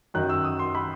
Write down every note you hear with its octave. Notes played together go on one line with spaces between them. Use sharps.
F#2 D#3 F#3 F#6
E6
D#6
C6
B5